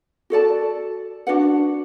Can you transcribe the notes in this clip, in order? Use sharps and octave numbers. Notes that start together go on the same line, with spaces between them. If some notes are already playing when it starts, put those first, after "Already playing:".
F#4 A4 D5 A5
D4 F#4 B4 F#5